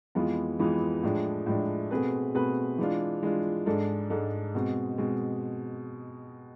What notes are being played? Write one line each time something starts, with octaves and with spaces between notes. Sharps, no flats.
F2 E3 G#3 B3 F4
F2 E3 G#3 B3 F4
A2 F3 G#3 D4
A2 F3 G#3 D4
B2 A3 C4 G#4 B4
B2 A3 C4 G#4 B4
E3 G#3 D4 F4
E3 G#3 D4 F4
G#2 G#3 D4 A4
G#2 G#3 D4 A4
B2 G#3 C4
B2 G#3 C4